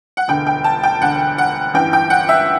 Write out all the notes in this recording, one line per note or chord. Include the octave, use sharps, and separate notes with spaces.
F#5
E1 D2 D3 G5
G5
A5
G5
E1 D2 D3 F#5
F#5
A1 G2 E3 G5
G5
F#5
E5